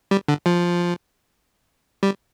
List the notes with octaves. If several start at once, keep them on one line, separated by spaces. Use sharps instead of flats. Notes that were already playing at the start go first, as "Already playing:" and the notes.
G3
D3
F3
G3